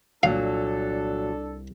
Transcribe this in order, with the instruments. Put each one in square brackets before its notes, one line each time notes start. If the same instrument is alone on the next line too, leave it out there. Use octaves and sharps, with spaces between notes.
[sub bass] C2 [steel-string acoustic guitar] A#2 F#3 [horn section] D4 A4 [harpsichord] F5